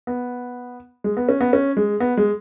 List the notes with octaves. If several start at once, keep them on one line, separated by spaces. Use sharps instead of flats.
B3
G#3
B3
C#4
B3
C#4
G#3
B3
G#3